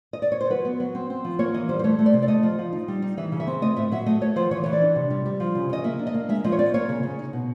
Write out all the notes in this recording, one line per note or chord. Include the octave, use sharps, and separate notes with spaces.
D#5
D5
C#5
C5
F#3 B4
B3
F#3
C4
C4
F3
A#3 C#5
E3 D#5
G3 C5
C5
A3 C#5
A3
D5
C3
D5
A3 D#5
F3
F3
D#4
G3
D#4
E3 E5
C#3
E5
C4
A3 D#5
A2 E5
F#3 E5
A3 D#5
A3 C#5
F3 C5
E3 C#5
E3 C#5
D5
D4
C3
G3
G3
F3
C#3
C#3 D#5
A#3 E5
D4
D#5
A#3
G#3 E5
F3 D#5
C#5
C4 D5
A#3 C#5
C#3
C#3
D#4
B2